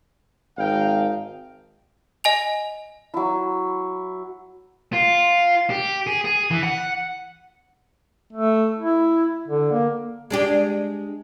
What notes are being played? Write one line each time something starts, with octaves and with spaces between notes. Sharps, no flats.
G#1 D#4 F5 G5
D#5 G#5 F7
F#3 E4
F4
G4
G#4
G#4
E3
F#5
A3
E4
D3
A#3
G#3 D4 G4